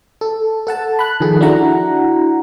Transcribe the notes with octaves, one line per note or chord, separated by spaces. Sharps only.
A4
A4 F#5 A5
B5 F#6
D#3 F3 G#4 A4
D4 E4 F#4 F#5 A#5